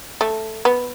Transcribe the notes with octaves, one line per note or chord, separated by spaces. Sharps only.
A3
B3